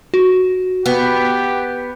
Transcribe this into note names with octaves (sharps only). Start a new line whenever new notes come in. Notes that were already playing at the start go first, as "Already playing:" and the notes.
F#4
B3 G4